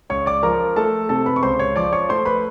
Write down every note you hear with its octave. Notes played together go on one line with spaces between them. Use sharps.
C#2 C#5 C#6
D5 D6
F3 A#4 A#5
A3 A4 A5
C3 A4 A5
B4 B5
C#6
C#2 C5 C6
C#5 C#6
F3 D5 D6
C#5 C#6
A3 C5 C6
B4 B5